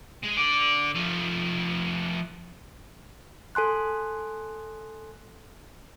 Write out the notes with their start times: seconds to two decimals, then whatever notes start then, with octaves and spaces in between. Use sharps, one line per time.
0.24 G#3
0.37 D3 D5
0.95 F3 A3
3.55 A4 G#5 C6 F#6